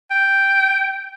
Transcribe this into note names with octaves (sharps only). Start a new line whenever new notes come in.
G5